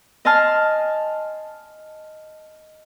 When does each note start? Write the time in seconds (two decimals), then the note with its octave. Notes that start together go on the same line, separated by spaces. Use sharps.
0.25 D#5 G#5 A5 C6 F6